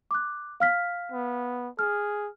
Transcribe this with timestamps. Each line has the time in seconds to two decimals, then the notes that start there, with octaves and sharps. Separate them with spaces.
0.11 D6 F#6
0.60 F5 F6 B6
1.12 B3
1.79 G#4 F6